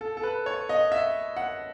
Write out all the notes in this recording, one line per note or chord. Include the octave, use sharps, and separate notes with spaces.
A4
A4
B4
C#5
D#5
E5
F#5